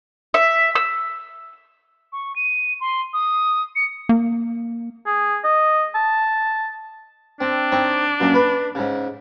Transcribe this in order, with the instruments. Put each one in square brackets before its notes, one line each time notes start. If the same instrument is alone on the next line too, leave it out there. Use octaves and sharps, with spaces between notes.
[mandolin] E5
E6
[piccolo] C#6
D#7
C6
D#6
C#7
[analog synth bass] A#3
[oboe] G#4
D#5
A5
[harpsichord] C4 [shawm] D4
[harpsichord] C4 D#4 C#5
F#2 A#2
B4
G#2 C#3